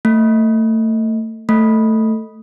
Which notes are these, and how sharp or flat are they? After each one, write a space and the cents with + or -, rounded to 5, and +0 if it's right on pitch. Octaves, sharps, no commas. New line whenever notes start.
A3 +30
A3 +10